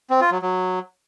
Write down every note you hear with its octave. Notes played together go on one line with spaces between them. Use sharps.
C4
F4
F#3
F#3